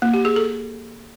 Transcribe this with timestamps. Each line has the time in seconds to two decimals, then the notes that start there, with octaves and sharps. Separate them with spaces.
0.02 A#3
0.14 G4
0.25 G#4
0.36 A4